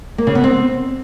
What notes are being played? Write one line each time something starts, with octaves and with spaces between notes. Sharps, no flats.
A#3
C#3
B3
C4